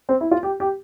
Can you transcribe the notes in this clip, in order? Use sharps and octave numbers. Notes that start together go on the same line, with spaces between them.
C4
E4
F4
G4
G4